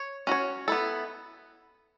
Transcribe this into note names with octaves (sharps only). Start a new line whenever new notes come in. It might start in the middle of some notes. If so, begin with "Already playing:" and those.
Already playing: C#5
C#4 F#4 C#5
B3 E4 A4